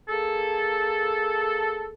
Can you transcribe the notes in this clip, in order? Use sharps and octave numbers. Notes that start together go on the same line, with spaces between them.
A#3 G#4 A4